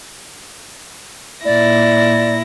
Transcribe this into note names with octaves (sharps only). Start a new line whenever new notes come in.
A#2 E4 D5 A#6